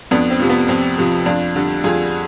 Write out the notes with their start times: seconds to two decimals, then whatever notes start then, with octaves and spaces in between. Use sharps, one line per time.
0.11 F2 B3 D4
0.30 C4
0.40 C3 F3
0.49 B3
0.68 F2 C4
0.98 C3 F3
1.26 F2 D4 F4
1.55 D3 G3
1.84 F2 F4 G#4